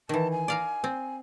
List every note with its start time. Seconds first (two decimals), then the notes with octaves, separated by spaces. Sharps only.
0.09 D#3 E3 A5
0.32 G#5
0.48 D5 F5 A#5
0.84 C4